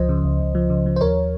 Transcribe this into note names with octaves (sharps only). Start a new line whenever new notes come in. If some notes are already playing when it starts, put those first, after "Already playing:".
Already playing: C#2 F3 C5 D#5
C#3
C#2
C#2
F3
C#3
F3
C5
D#2 A#4 C#5